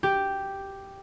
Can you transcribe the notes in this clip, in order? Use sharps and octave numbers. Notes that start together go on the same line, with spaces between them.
G4